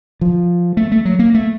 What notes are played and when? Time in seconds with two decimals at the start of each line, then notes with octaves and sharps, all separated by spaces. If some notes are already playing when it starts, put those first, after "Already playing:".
0.21 F3
0.77 A3
0.92 A3
1.05 F#3
1.19 A#3
1.34 A3